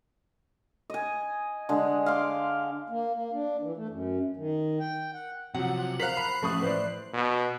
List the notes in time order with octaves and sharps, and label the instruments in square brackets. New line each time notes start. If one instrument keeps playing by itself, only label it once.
[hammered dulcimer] D#5 G#5
D3 G#3
F5 C6 D6
[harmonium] A#3
A#3
D4
E3
A3
F#2
D#3
G5
F#5
[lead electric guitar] C3 [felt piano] F3 F#3 [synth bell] F#5
[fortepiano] A#4 C5 F5 [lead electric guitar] A#5 [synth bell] F#6 C7 F#7 [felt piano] B6
[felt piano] B5
[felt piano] A1 [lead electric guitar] F3 [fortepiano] A3 C#6 D#6
[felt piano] A2 [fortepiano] B4 C5 D5
[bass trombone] B2